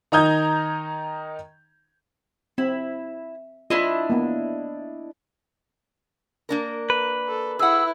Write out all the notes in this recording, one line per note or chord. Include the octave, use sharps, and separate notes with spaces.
D#3 D#4 A#5 D#6 G6 G#6
C4 E4
D4 E4 F4 D#5
A#3 B3
A#3 D4 A#4
B4
A4
E4 G#4 F#5 E6